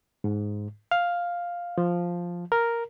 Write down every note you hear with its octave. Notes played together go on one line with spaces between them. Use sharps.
G#2
F5
F3
A#4